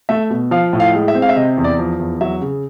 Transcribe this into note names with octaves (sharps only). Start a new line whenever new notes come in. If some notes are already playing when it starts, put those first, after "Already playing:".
A3 E5
B2
F3 F5
A2
F5
G#3
E5
C4
F5
E5
C3 D#5
E2
D5
F3
E2
F#3 E5
C#3